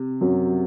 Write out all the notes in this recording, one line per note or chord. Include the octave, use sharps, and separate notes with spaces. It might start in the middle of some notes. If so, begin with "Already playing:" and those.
Already playing: C3
F#2 F#3